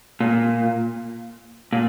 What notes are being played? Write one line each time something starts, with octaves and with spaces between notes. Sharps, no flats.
A#2
A#2